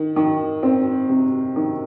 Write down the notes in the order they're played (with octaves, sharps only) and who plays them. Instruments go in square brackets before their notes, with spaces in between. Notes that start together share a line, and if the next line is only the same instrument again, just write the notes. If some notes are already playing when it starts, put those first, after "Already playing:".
Already playing: [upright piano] D#3
D#3
C4
C3
D#3